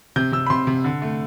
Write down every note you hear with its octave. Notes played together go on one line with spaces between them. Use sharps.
C3 G6
C3 E6
B5
C3 C6
C3
D3
A3